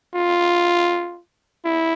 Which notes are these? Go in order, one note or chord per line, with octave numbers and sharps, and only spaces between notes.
F4
E4